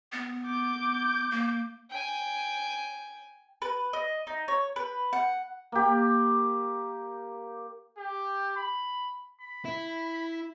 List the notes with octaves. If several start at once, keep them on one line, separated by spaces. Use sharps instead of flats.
B3
D6 G6
A#3
G5 G#5
B4
D#5
D#4
C#5
B4
F#5
A#3 G4
G4
B5
B5
E4